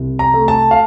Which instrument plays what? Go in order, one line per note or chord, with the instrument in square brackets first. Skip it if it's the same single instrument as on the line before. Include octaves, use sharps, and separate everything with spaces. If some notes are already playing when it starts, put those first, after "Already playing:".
Already playing: [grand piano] C2
A#5
A3
A5
F5